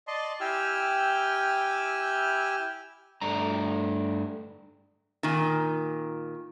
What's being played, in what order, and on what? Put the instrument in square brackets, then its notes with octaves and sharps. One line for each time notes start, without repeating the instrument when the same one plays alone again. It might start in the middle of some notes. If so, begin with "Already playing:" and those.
[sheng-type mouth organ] D5 D#5 A5 C6
E4 G4 G5 G#5 E6 F6
[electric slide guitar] G2 A3 D4 A#5
[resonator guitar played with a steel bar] A#2 D#3